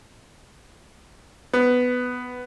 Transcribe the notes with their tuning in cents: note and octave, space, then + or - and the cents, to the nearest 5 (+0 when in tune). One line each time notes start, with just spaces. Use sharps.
B3 +10